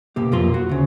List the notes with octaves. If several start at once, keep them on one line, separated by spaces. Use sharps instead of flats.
B2 A#3 G4
B1 F2 A#3 F4 C6
F#4
D2 C#3